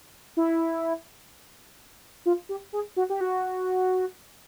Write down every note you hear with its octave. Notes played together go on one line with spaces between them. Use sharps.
E4
F4
G4
G#4
F#4
G4
F#4